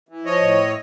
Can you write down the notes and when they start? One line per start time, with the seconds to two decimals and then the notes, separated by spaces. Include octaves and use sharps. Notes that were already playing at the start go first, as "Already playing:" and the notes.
0.09 E3
0.25 F3 C#5 D#5
0.42 A2